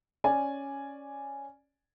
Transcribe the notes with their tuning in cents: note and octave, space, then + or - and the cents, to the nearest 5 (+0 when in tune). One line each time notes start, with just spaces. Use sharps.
C#4 +0 D5 +0 G#5 +0